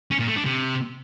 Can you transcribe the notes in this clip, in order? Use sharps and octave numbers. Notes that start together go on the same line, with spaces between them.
C#4
A#2
A3
D4
C3